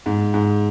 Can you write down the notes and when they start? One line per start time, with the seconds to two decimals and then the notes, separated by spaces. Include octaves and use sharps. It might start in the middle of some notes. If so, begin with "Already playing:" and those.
0.06 G#2
0.34 G#2